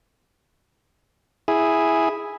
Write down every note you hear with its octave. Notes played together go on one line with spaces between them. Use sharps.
E4 G#4